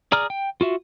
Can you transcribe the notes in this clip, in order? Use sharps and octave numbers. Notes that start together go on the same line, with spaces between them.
G#4 D5 A#5 F6
G5
F4 F#4 E5